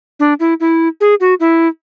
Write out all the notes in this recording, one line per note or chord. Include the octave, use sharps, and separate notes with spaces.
D4
E4
E4
G#4
F#4
E4